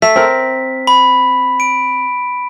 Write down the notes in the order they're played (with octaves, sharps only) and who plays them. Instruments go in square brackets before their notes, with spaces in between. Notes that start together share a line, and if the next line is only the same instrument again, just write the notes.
[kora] A3 [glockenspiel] B6
[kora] C4 A#4
[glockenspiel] B5
D7